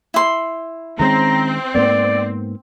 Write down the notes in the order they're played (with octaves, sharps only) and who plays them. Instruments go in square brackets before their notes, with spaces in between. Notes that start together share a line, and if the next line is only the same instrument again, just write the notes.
[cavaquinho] E4 C6
[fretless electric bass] D#3 G#3 C#4 [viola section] C4 [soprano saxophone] A#5
[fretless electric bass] G#2 A#3 B3 [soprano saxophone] D5